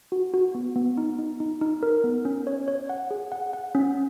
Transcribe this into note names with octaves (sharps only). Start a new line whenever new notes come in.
F#4
F#4
B3
B3
D#4
D#4
D#4
D#4
A#4
B3
C#4
C#5
C#5
F#5
G#4
F#5
F#5
C#4